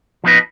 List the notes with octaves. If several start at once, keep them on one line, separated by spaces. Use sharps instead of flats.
F3 B3 D#4 B4 D#5